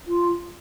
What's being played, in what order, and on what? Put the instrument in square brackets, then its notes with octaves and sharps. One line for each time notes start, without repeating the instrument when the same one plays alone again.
[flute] F4